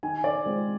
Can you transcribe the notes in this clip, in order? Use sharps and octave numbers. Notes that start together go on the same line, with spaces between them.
D#3 G#5
D5
G#3 C4 F4 C5